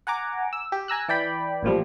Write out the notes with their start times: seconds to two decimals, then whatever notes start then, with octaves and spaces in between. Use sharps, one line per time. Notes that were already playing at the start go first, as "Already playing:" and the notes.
0.07 F#5 G#5 A#5 D6
0.53 E6
0.72 G4
0.88 G#5 A#5 E6 F#6
1.09 E3 D5 G5 B5
1.63 A1 A#2 F3 G3